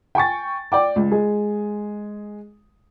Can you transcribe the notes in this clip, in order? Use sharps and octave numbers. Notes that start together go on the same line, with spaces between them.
G5 G#5 C#6 A6
D5 G5 D6
C#2
G#3 G#4